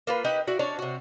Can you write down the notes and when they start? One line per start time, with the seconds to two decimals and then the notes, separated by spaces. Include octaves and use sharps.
0.07 A#3 F4 B4
0.24 D#4 G4 B4 F#5
0.47 E4 F#4 D5
0.59 C#4 D4 C#5 D5
0.79 C3 F#4